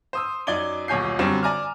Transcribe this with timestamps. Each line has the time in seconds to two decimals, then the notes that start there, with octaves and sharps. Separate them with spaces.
0.13 C5 D#6 E6
0.47 F#2 D#4 D5 D6 G#6 G7
0.88 D#1 B1 C#5 G#5 G6 C7
1.19 F#2 D3 G3 C4 C#6 E7
1.43 D5 G#5 A#5 D6 F6